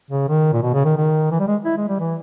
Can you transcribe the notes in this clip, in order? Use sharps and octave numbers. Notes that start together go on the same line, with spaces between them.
C#3
D#3
A#2
B2
C#3
D#3
D#3
E3
G3
G#3
E4
G#3
G3
E3